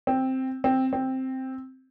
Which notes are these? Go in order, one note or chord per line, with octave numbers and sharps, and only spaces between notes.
C4
C4
C4